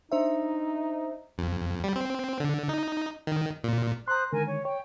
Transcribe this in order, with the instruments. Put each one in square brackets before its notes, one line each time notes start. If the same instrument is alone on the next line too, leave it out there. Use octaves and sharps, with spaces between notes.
[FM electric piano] D4 C5 E5 [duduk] D#4
[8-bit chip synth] F2
G3
C4
D3
D#4
D#3
A#2
[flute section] C5 D#6 F#6 [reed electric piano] A#5 C6
[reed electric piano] D3 D#3 G#3 [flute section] A#4 G#5
[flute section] C#5
[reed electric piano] C#5 [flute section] G5